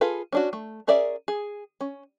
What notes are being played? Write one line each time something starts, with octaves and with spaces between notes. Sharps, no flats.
F4 G#4 A4 B4
C#4 D4 F#4
A3
C#4 G#4 A#4 D5 E5
G#4
C#4